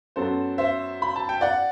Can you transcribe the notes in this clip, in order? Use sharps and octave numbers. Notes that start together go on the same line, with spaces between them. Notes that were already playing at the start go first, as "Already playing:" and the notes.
F#2 F#3 B3 A4 C5
C5 E5
B5
A5
G5
D5 F#5